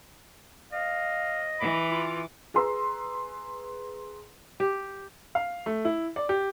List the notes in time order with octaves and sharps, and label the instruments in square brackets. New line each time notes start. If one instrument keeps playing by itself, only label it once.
[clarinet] D#5 [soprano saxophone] F5
[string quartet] E3 D6 [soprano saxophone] B5
[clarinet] F4
[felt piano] G#4 B4 A#5 C6 E6
[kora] G4
[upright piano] F5
A3
E4
D5
G4